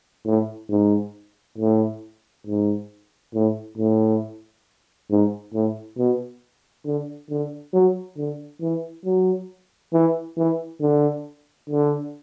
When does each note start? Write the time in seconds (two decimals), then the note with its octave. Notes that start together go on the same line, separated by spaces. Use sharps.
0.26 A2
0.70 G#2
1.58 A2
2.47 G#2
3.34 A2
3.77 A2
5.10 G#2
5.54 A2
5.98 B2
6.86 D3
7.30 D3
7.74 F#3
8.17 D3
8.62 E3
9.05 F#3
9.93 E3
10.37 E3
10.81 D3
11.70 D3